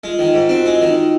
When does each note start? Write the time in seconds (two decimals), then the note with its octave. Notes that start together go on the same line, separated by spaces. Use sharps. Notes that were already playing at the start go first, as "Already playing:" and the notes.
0.04 G#3 F4
0.19 D#3
0.34 G#2
0.49 C4 F#4
0.65 G#3 E4
0.81 D#3 D#4